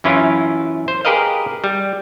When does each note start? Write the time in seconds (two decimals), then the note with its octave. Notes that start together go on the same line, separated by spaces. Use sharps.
0.04 F#2 E3 C#4 E4 F4
0.88 C5
1.05 G4 G#4 A#4 B4 D#5 F5
1.64 G3